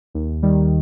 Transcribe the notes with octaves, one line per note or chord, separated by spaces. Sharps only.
D#2
D#3 G3